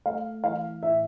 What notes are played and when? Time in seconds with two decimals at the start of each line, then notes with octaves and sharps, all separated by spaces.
0.06 A3 F5
0.44 E3 F5
0.82 A2 E5